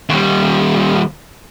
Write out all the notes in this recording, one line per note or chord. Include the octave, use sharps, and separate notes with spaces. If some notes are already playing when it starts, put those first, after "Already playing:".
D#2 G3